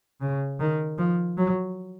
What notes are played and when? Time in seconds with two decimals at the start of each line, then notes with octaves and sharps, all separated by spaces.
0.21 C#3
0.60 D#3
0.99 F3
1.38 F#3